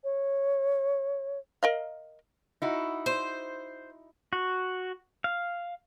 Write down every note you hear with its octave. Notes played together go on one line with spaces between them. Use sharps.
C#5
A#4 D#5 F5
D#4 E4 F#4
C5
F#4
F5